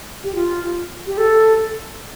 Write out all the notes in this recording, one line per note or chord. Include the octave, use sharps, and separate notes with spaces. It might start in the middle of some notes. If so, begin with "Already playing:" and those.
G4
F4
G4
A4